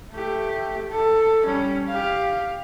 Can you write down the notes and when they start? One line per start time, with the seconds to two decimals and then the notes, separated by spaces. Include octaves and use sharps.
0.12 A3 G4
0.92 A4
1.43 G3 C#4
1.89 G4 F5